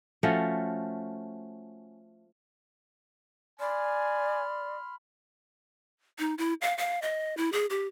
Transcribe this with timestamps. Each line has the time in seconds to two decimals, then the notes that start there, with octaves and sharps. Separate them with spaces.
0.23 F3 A3 C#4 F#4
3.60 D5 G#5 B5 C6 F6
6.19 D#4
6.38 E4
6.61 F5
6.78 F5
7.02 D#5
7.37 E4
7.52 G#4
7.70 G4